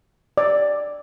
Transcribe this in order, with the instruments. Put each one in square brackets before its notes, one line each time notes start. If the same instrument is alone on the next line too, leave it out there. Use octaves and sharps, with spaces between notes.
[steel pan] D5